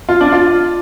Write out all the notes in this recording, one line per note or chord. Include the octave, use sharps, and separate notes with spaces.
F4
D4
F4